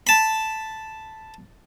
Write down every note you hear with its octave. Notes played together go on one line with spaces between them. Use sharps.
A5 B5